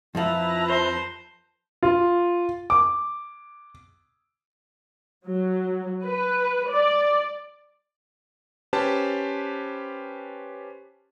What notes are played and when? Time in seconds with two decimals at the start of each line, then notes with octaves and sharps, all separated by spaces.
0.15 F2 F3 E4 B4 A5 A#5
0.68 C5
1.83 F4
2.70 D6
5.26 F#3
6.04 B4
6.70 D5
8.73 C#4 G4 B4 C5 A5